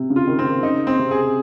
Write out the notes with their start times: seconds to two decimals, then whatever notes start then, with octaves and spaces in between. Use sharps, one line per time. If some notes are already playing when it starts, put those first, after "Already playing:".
Already playing: C3
0.10 C#3
0.16 F4
0.27 D#3
0.39 C4
0.45 D#3
0.63 C#3 D#4
0.87 C4
0.99 C3
1.11 G#4